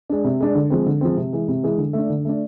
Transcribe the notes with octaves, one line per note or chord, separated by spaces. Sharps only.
G#3 D4
C3
G#3 D4
D3
F3 G#3 C4
D3
F3 G#3 C4
C3
E3 G#3
C3
E3 G#3
D3
A3 D4
D3
A3 D4